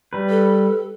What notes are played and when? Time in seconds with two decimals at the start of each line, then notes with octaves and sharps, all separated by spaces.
0.13 G3 B4
0.30 A4